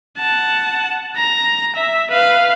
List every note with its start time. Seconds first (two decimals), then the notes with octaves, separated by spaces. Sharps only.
0.18 F#5 A5
1.17 A#5
1.76 E5
2.11 B4 F5